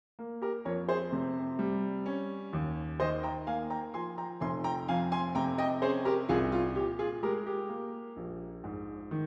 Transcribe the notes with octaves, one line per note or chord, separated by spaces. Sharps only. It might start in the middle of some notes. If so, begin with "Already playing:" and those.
A#3
G4 A#4
F2 A#4 C#5
G#4 C5
C3
G3
C#4
D#2
D#3 C5 D#5
G5 A#5
A#3 F5 G#5
G5 A#5
F3 G#5 C6
G5 A#5
F1 G#5 C6
G5 A#5
F2 F5 G#5
G#5 C6
C3 G5 A#5
D#5 G5
C#4 G#4 C5
G4 A#4
C2 F4 G#4
F4
A#2 G4
F4 G#4
G#3 G4 A#4
G4
A#3
A#1
G#2
D#3